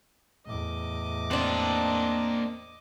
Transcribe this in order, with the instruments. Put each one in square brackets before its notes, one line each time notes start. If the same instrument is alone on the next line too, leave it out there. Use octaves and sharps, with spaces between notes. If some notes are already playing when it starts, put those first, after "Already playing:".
[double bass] E2 A2 [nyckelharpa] D#5 D6
[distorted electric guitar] A#3 F#5 [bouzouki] C4 D4